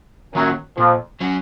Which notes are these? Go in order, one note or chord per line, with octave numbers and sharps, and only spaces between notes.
F#2 D#3 F#3 A#3 C#4
F2 A#2 F3
F#3 C#4 F#4